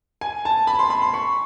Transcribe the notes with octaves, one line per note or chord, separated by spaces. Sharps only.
G#5
A5
B5
C6
B5
C6
C#6